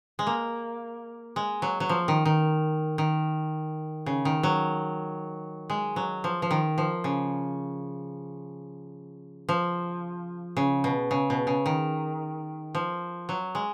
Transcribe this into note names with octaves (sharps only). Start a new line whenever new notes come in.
G#3
A#3
G#3
F#3
F#3
F3
D#3
D#3
D#3
C#3
D#3
F#3
G#3
F#3
F3
F3
D#3
F3
C#3
F3
C#3
B2
C#3
B2
C#3
D#3
F3
F#3
G#3